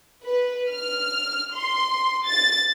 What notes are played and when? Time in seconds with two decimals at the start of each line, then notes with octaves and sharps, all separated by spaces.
0.24 B4
0.71 F6
1.54 C6
2.27 A6